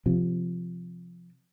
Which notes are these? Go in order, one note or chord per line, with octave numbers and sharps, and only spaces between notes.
C3 F3